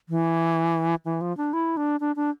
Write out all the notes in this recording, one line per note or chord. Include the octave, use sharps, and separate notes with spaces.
E3
E3
F3
D4
E4
D4
D4
D4